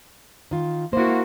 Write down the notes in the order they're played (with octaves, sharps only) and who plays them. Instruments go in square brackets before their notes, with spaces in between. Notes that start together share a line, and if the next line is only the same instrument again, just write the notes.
[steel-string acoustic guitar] D#3 F4
[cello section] A#3 F#4 [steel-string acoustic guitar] E4 C5